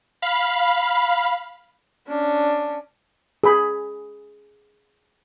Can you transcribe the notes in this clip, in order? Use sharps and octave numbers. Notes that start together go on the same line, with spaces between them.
F5 B5
C#4 D4
G#4 B5